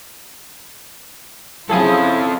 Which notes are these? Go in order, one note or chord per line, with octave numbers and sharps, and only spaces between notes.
C#3 F3 F#3 C4 E4 G#4 A4 D#6